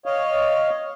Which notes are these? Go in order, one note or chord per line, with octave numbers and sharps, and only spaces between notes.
C#5 D#5 F5